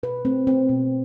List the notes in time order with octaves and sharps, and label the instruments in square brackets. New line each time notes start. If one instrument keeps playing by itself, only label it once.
[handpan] B2 B4
A3 C4
A3 C4
B2